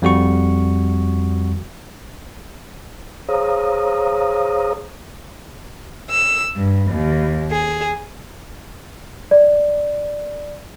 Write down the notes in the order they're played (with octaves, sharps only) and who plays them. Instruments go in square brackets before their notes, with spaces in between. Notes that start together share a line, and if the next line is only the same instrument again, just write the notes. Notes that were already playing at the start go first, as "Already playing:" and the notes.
[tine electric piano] F2 G3 F#4 C#6
[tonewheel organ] G#4 C5 C#5 F5 A#5 D#6
[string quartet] E6
G2
D#2
G#4
[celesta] D5